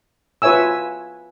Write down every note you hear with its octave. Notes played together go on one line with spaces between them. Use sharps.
F4 B4 C#5 E5 G#5 E6